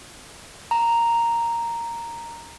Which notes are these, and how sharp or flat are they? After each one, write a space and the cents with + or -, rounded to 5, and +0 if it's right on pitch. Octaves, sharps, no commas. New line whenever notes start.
A#5 -5